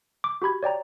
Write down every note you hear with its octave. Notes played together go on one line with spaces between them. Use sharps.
D6
F#4 G4 B5 G#6
C#5 D5 G5 A#5